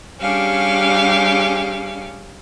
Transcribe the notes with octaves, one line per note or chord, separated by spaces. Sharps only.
G3 C#4 D4 G4 G#4 F5